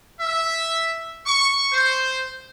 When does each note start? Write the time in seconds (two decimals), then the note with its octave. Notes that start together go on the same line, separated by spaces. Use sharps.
0.21 E5
1.26 C#6
1.73 C5